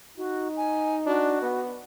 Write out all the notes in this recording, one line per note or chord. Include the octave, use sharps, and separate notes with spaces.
D#4 F#4
G#5
D4 F#4
B3